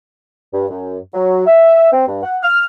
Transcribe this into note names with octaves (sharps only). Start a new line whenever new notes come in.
G2
F#2
F#3
E5
C4
G2
F#5
F6